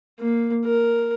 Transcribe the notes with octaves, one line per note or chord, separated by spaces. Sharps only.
A#3
A#4